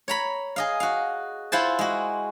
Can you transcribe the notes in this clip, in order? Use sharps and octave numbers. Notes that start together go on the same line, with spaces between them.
C#5 A#5 B5
G#4 D#5 F5
F#4 F5
E4 F4 C5 F#5 G#5 A5
G#3 F#4